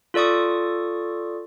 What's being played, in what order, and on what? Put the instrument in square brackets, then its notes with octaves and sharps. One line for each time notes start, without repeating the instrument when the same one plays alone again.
[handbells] F4 A4 D5 C#6 D#6